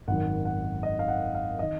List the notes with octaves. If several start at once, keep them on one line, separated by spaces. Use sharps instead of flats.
G#1 F#2 D#3 F#5
F#5
D#5
F5
F#5
F5
D#3 D#5